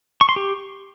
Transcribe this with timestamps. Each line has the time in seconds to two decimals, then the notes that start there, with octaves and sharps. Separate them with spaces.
0.21 C#6
0.29 C6
0.36 G4